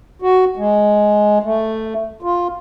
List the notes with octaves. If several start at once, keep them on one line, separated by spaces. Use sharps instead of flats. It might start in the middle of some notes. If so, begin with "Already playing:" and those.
F#4
G#3
A3
F4